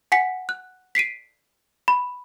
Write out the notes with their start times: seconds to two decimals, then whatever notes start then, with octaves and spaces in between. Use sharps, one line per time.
0.12 F#5 G#5 B6 C#7
0.49 F#6
0.95 B6 C7 D7 D#7
1.88 B5